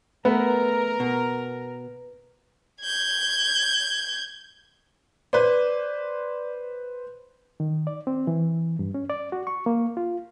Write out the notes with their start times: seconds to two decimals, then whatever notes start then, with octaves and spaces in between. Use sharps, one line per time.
0.25 A3 B3 A#4 B4
1.00 B2
2.82 G6 G#6
5.33 B4 C5 D5
7.60 D#3
7.87 D5
8.07 C4
8.27 E3
8.79 G2
8.94 C#4
9.10 D5
9.32 F#4
9.47 C#6
9.66 A#3
9.97 F4